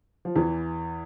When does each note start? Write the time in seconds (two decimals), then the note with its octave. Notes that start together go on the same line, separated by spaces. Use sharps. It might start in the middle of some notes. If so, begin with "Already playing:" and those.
0.25 F3
0.36 E2 E3